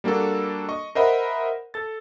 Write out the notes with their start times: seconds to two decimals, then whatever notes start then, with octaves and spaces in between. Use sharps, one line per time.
0.04 G3 A#3 D4 F#4 A4
0.69 D#5 C#6
0.95 A#4 C5 D#5 E5 F#5 B5
1.74 A4 A6